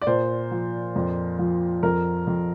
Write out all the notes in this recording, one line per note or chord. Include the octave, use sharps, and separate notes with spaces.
D5
A#2 C5
F3
F2
F3
F2 A#4
F2